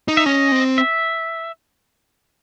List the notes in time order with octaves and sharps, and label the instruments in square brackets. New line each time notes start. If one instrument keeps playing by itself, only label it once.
[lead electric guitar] D#4
[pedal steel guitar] E5
[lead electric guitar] C#4 [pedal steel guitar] D#5
[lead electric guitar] C4
[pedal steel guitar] E5